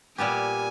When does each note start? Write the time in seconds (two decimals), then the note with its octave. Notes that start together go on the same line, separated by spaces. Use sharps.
0.18 A#2 G3 B3 G4 G#5